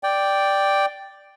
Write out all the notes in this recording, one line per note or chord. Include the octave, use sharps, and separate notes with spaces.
D5 G5